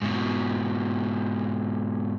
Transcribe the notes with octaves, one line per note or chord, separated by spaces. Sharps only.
G#2 B2